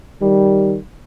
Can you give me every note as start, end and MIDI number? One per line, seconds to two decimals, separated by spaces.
0.21 0.78 51
0.21 0.78 55